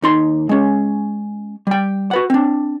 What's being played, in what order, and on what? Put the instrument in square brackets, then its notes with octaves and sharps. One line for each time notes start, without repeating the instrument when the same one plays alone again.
[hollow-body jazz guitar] D#2 D#4 C6
G#3 C#4
G3 G5
F#4 B4 F#5
C4 D4